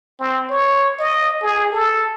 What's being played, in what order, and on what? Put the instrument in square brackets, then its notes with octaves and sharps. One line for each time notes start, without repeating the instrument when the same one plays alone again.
[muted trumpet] C4
C#5
D#5
G#4
A4